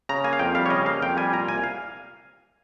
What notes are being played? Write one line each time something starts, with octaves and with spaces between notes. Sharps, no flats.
C#3 A#5
A#3 G#5
F5
F2 G5
G3 F5
C#5
C#3 D#5
A#3 F5
F2 G5
G3 G#5
A#2 A#5
C2 G#5
F5